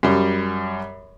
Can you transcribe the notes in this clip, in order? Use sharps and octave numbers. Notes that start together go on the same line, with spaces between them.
F#2 G3